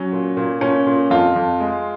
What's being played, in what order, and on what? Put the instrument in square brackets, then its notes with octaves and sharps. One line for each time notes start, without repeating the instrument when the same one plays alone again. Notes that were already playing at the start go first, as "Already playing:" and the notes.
Already playing: [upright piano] F#3 C#4
A#2
A#2
A#2 C#4
A#2
F2 F4
F2
G#3